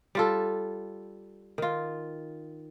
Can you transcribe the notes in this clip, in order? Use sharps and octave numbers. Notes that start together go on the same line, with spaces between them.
G3 F4 A4
D#3 F4